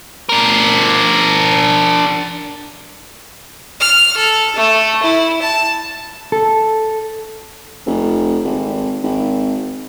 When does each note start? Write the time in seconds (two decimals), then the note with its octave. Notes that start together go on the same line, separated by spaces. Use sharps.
0.29 D4 A#4
3.81 F6
4.17 A4
4.56 A3
5.03 E4
5.41 A5
6.32 A4
7.86 F1
8.44 G#1
9.03 G#1